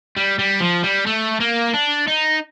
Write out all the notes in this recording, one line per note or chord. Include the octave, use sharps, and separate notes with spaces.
G3
G3
F3
G3
A3
A#3
D4
D#4